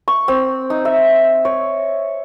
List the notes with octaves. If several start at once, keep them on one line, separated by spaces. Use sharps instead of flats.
C#6
C4
D#4
E5
C#5